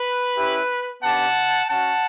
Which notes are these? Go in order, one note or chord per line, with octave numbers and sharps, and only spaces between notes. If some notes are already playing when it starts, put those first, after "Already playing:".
Already playing: B4
C#4 E4 G4
B3 D4 G4 F#5 A5
C#4 F#4 F#5 A5